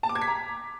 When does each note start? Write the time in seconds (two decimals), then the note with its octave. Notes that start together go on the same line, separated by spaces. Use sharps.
0.03 A5
0.09 D6
0.15 G#6
0.22 B6
0.28 A#5